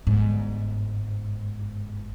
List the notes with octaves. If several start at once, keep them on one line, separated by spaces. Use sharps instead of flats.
G1 G#2